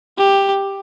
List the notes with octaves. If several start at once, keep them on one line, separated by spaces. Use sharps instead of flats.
G4